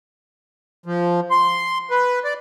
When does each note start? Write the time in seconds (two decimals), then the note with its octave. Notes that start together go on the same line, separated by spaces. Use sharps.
0.86 F3
1.31 C6
1.91 B4
2.24 D5